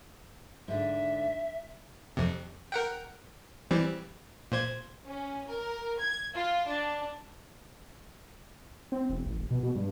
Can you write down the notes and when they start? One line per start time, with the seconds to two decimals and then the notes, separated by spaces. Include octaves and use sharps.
0.68 G#2 D3 E5
2.17 F2 C3
2.72 A#4 F#5 G5
3.71 E3 G3 C4
4.52 A#2 C5 G#6
5.05 C#4
5.47 A#4
5.98 G#6
6.35 F4
6.67 D4
8.92 C4
9.10 E1
9.26 A1
9.38 D#1
9.51 B2
9.63 B2
9.76 G2